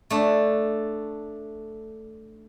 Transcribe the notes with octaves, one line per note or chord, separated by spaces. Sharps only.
A3 D4